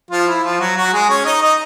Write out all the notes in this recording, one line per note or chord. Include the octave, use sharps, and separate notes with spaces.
F3 F4
E4
F3 F4
F#3 F#4
F#3 F#4
G#3 G#4
C#4 C#5
D#4 D#5
D#4 D#5